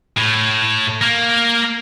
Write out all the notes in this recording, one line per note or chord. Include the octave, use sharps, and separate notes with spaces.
A2
A#3